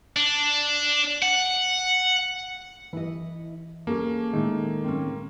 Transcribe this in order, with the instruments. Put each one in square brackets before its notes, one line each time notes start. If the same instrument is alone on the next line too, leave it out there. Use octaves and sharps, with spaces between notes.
[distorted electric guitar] D4
F#5
[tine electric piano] E3 [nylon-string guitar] E4 D#5
[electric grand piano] A#3 [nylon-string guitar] C#4 G#4 A4
[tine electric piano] A2 G#3 [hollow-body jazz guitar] D#3 A3
[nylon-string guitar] C4 C#4